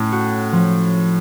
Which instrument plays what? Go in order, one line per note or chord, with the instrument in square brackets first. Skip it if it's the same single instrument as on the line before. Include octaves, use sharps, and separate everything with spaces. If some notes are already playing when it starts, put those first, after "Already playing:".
Already playing: [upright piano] A2 [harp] C#4
[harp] F#4
F3